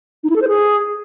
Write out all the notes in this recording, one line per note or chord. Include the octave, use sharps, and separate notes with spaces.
D#4
E4
A4
C5
G#4